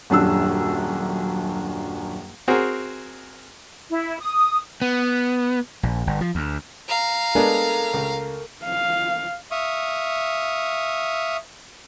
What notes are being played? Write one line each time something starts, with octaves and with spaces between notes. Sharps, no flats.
D#1 F#2 D4 E6
C4 F#4 G#4 A#4
E4
D#6
B3
A#1
G1
F3
D2
F5 A#5
G#3 B3 D4 A4 A#4
C#2
F5
E5 F5 C#6 D#6